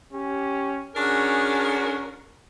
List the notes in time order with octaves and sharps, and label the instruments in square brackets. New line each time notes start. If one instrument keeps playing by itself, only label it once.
[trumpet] C#4 [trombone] G4
[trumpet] C#4 [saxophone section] D4 F#4 A#4 [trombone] G#4